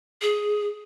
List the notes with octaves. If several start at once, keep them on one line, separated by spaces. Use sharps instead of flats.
G#4